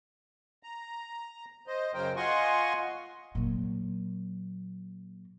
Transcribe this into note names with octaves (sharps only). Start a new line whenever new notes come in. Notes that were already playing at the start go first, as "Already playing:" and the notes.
A#5
C5 D#5
F#2 C#3 F#3 A#4 C5 G5
F4 D#5 F#5 G#5 C6 C#6
A#2 F#3